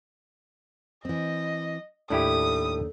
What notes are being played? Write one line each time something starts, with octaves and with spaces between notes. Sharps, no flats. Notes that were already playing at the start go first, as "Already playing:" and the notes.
E3 C4 D#5
D#2 A2 D4 E4 G4 A4 D#6